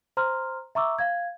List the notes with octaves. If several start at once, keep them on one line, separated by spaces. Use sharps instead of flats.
C5 A#5 C6 F6
E5 A#5 C#6 D6 E6
F5 G#6